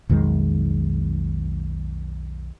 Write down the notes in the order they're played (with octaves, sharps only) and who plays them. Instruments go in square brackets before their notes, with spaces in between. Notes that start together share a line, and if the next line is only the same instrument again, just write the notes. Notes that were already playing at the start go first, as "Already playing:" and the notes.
[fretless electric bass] B1 F2 D#3 G#3